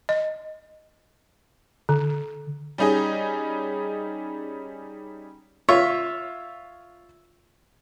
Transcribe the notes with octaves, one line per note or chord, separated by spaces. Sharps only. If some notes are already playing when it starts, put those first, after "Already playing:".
D#5
D3
G3 C#4 D#4 G#4 D#5
F4 C#5 E5